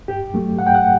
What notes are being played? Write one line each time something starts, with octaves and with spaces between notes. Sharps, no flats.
G2 G4
F#3 A3
G2 F#5
G5
F#5